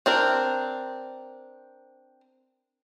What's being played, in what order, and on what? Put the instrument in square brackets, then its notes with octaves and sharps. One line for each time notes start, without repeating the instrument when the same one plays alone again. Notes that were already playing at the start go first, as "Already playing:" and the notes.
[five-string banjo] C4 D4 A#4